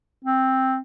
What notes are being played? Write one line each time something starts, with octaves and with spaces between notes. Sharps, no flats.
C4